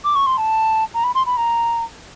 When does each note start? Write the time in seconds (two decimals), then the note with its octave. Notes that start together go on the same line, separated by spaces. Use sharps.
0.04 D6
0.15 C#6
0.26 C6
0.37 A5
0.94 A#5
1.03 B5
1.15 C6
1.26 B5
1.37 A#5